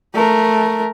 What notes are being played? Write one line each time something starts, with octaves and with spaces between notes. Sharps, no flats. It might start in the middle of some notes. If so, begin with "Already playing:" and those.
A3 A#4